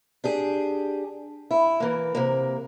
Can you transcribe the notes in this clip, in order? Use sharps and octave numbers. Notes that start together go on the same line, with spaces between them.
D4 G4 G#4
E4
E3 A#3
C3 A#3